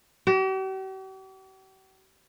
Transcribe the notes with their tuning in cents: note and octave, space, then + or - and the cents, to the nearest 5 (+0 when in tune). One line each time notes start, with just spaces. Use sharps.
G4 -45